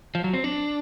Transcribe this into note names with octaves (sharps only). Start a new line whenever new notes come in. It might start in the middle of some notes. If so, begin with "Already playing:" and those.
F3
F#3
C4
D4